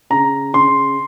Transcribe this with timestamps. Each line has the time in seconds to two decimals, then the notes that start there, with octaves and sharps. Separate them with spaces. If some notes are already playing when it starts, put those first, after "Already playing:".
0.10 C#3 A#5
0.53 C#3 C6